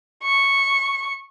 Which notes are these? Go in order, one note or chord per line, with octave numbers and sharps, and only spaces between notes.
C#6